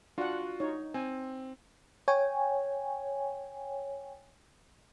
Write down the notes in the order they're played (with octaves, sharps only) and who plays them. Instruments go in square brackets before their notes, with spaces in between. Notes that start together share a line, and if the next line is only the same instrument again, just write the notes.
[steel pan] D4 F#5 [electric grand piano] F4 F#4
[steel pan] D#4 C#5
[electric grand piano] C4 [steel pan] G#5
[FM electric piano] C#5 G5 G#5